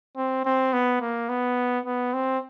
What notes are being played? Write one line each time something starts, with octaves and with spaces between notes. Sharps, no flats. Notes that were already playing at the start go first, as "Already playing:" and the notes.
C4
C4
B3
A#3
B3
B3
C4